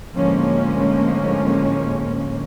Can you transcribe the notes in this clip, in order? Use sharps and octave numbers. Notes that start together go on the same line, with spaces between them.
A2 D3 F3 G#3 A#3 C#4